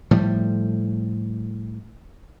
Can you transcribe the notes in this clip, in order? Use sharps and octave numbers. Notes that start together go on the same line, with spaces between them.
A2 F3 G3